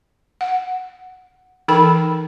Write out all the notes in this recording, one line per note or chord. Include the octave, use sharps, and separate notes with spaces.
F#5
E3 D#4 A4 A#4 G5 B5